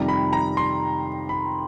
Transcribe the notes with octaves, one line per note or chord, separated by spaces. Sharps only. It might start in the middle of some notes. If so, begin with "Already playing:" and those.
Already playing: F2 C3 D#3 G3 A#5
B5
A#5
C6
B5